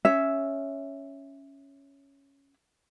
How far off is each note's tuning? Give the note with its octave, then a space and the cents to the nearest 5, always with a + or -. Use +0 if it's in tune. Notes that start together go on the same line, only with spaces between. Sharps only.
C#4 +0 E5 +0